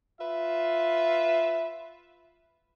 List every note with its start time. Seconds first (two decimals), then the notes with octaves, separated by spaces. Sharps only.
0.21 F4 B4 E5